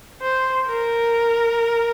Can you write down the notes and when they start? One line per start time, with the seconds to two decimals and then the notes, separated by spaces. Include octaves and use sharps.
0.22 C5
0.66 A#4